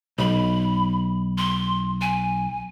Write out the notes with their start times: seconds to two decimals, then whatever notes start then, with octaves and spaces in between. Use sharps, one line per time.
0.18 B1 B5
1.38 C6
2.01 G#5